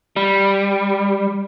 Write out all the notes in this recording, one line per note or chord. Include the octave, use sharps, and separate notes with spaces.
G3